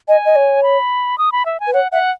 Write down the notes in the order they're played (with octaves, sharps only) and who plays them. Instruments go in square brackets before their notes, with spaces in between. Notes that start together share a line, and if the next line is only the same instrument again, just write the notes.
[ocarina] D#5 [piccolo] G#5
[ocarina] D#5
C#5
[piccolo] B5
D#6
B5
E5
G#5
[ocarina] B4
[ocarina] C#5 [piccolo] F#5
[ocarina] E5 [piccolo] F#5